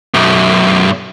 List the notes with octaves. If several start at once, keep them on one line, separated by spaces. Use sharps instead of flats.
B1 F#2